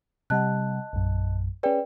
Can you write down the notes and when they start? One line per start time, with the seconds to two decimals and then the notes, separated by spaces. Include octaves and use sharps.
0.30 C3 G3 D#5 F#5 A5 F#6
0.93 A#1 F#2
1.63 C#4 G#4 B4 D5 G5